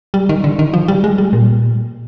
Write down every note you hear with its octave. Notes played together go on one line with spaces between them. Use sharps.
G3
D#3
D3
D#3
F3
G3
G#3
G3
A#2